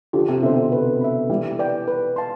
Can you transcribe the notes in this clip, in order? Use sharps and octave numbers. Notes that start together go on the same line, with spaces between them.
D3 F3 G4
C3
B2 D3 C5 E5
C3
C3 B4
E5 B5
E3 G3 E4
B4 D5 G5
B4
F5 A5 C6